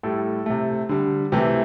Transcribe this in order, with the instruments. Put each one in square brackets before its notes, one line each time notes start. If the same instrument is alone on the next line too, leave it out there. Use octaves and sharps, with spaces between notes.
[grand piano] A2 G3 A4
C3 A3
D3 G3
C3 E3 A3 G4